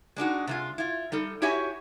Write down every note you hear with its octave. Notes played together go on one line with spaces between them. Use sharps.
G#3 D4 D#4 F#4
C3 G#3 F4
E4 F4
G3 D#4 A4
E4 F#4 G4 C#5 E5 G#5